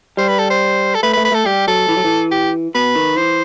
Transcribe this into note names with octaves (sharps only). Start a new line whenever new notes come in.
G3 C5
B4
A4
C5
A4
A3 B4
B4
A3
B4
A3 A4
G3 G4
F#3 A4
E3
F#3
E3
G4
B2 B4
D#3
E3 C5